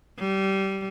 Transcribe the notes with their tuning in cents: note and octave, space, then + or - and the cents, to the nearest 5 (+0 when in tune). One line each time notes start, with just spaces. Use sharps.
G3 -20